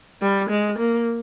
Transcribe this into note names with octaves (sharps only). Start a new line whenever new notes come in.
G3
G#3
A#3